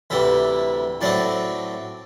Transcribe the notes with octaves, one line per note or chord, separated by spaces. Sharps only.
D2 C3 E3 G3 E5
A2 F#3 A3 C4 D5